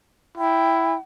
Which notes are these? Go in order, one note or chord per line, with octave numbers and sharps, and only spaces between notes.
E4 G5